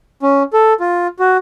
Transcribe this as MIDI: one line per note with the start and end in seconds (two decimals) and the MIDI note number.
0.23 0.43 61
0.53 0.73 69
0.80 1.07 65
1.19 1.37 66